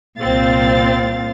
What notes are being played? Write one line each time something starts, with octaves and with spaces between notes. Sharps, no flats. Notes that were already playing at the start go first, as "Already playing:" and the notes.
C2 A#2 C4 F5 A6